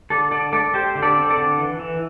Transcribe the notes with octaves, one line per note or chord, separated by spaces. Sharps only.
D3 A4 D5
D3 A4 D5
A3 A4 D5
A3 G4 C5
D3
A4 D5
C4
A4 D5
D3
E3
E3